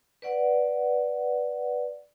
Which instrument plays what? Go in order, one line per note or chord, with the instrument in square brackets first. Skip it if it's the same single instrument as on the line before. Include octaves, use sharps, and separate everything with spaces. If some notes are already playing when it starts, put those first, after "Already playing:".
[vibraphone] B4 D5 F#5